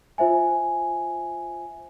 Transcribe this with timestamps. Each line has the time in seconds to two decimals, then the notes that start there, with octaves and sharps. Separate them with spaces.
0.18 F4 C5 E5 G#5